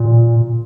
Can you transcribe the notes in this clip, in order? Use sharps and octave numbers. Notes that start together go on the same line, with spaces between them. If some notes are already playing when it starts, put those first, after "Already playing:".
Already playing: A#2